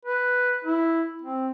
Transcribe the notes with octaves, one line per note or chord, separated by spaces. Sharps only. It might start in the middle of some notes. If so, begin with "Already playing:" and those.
B4
E4
C4